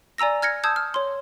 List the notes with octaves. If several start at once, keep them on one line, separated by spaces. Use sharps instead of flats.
D5 G#5 A#5 E6 A#6
F6 G#6 A#6 C#7
A5 D#6 E6 G6 G#6
F6
C#5 C6